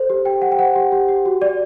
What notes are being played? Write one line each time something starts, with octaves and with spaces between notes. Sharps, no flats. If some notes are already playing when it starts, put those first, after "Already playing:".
Already playing: A4 C5
G4
G4 G5
G4 F#5
G5
C5 F#5
G4
G4
G4
F#4
D5